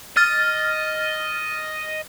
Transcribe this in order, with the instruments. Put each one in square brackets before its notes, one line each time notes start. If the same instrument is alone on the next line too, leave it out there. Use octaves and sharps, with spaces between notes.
[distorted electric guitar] D#5 [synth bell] F6 A6